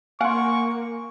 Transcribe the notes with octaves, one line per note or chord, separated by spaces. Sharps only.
A#3 F5 F#5 G#5 C6 C#6